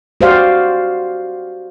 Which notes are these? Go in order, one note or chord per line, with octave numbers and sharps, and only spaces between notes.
F#4 G4 C5 D5 F5